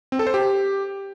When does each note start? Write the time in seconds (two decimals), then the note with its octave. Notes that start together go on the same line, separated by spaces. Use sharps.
0.12 C4
0.19 A4
0.27 C5
0.34 G4